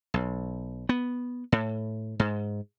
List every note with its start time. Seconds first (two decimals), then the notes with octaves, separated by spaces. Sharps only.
0.14 B1
0.89 B3
1.52 A2
2.20 G#2